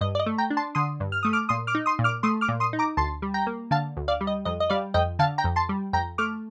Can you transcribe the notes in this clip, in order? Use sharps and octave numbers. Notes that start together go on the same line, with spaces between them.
G2 D#5
D5
D#5
A3
G5 A#5
D4
A5 C6
D3 C6 D#6
G2
F6
A3 D#6
D6 F6
A#2 C6 D#6
D6 F6
D#4
C6 D#6
A#2
D6 F6
A3 C6 D#6
D6 F6
A#2
C6 D#6
D#4
A#5 D6
D2 A5 C6
G3
G5 A#5
A#3
D3 F5 A5
D2
D5 F5
G3
D#5
F2 D#5
D#5
G3 D5 F5
F2 D#5 G5
D3 F5 A5
G5 A#5
F2
A5 C6
G3
F2 G5 A#5
A3 D6 F6